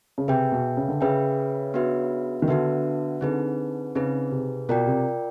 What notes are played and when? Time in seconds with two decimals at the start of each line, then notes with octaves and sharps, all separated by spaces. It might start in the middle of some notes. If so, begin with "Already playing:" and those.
0.18 C#3
0.28 C3 G#4 B4 E5 G5
0.52 B2
0.77 C#3
0.88 D3
1.01 C#3 G#4 B4 E5 G5
1.74 B3 D4 F#4 B4 E5
2.42 D#3
2.48 D3 B3 D4 F#4 B4 E5
3.21 D3 C4 D#4 G#4 B4
3.95 C#3 C4 D#4 G#4 B4
4.32 C3
4.69 B2 F4 A#4 D5 G5
4.87 C3